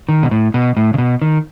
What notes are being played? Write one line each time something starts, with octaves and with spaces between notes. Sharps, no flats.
D#3
B2
A2
B2
A2
C#3
B2
D#3